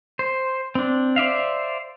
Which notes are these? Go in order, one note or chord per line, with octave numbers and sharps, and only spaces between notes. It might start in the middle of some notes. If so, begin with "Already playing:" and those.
C5
C4 D4
C5 D5 E5 F5